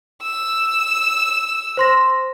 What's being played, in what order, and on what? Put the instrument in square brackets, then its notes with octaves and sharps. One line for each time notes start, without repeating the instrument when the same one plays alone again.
[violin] E6
[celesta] C5 C6 A#6